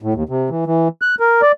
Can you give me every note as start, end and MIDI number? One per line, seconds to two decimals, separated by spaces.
0.02 0.14 45
0.14 0.23 39
0.29 0.50 48
0.50 0.64 52
0.66 0.88 52
1.02 1.15 90
1.20 1.41 70
1.42 1.52 74